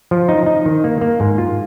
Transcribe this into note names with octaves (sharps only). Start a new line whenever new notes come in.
F3
D#4
D#4
D#3
A#3
A#3
G#2
F4